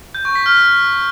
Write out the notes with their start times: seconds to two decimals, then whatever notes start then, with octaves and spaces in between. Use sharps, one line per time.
0.15 G6
0.25 C#6
0.35 B6
0.46 F6
0.56 F#6